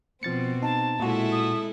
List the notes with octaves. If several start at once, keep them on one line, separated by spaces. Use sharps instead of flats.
B2 F3 C4 A6 C#7
D#4 A5
A#2 G#3 E4 F#4 A4 E5
D#6